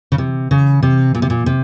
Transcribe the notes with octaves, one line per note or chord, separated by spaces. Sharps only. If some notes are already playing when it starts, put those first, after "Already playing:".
C#3
C3
C#3
C3
A#2
C3
A#2
C3